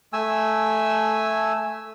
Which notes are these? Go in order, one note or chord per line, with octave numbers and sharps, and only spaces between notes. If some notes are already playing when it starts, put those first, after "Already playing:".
A3 G#5 E6